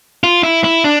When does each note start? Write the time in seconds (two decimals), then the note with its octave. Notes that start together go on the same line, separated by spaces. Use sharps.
0.24 F4
0.43 E4
0.64 E4
0.84 D4